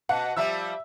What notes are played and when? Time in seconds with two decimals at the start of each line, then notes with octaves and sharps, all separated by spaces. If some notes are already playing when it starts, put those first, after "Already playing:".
0.09 B2 F#5
0.36 F3 G3 E5 E6